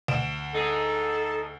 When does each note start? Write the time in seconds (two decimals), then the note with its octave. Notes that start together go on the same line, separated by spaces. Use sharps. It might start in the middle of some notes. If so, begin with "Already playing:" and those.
0.08 D2 D7 E7
0.55 D#4 G#4 A4